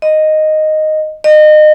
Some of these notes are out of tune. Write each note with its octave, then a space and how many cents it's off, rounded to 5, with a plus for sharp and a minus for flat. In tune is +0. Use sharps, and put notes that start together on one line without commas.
D#5 -5
D#5 -30